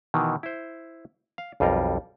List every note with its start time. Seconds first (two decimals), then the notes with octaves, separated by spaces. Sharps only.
0.14 B2 D#3 E3
0.43 E4 C5
1.38 F5
1.60 B1 F2 G3 F4 A#4